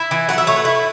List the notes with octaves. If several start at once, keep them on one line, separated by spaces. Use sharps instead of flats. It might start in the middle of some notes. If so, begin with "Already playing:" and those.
Already playing: E4 E5
E3
F#3 F#5
E5
A3 C#5
B4
E4